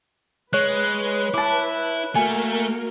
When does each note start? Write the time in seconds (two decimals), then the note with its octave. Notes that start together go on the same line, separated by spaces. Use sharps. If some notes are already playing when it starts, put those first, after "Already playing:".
0.53 G#3 B4 C#5 F#6
1.34 E4 A5 D6
2.15 A3 A#3 F#4 A#4 G#5